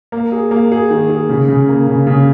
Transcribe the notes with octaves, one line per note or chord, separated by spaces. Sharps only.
A#3
G#4
A#3
G#4
D#3
G#4
C#3
C#3
A#3
C#3
C#3